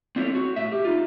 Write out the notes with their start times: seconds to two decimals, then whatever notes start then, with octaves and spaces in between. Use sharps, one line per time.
0.16 C4 D4 E4 F4 A4 C#5
0.35 F#4
0.56 A2 E5
0.72 G4
0.85 D#4 F4